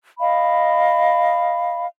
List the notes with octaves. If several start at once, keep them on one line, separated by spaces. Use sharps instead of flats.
D#5 F5 B5